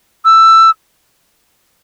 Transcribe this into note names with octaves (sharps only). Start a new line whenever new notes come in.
E6